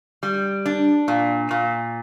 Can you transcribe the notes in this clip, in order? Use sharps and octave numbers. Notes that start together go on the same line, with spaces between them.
G3
D4
A#2
A#2